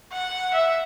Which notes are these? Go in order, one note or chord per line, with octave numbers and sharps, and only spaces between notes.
F#5
E5